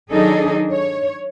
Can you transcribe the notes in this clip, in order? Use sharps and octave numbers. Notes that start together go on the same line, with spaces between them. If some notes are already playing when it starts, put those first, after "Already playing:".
D#3 F#3 D4 D#4 G#4 A4
C#5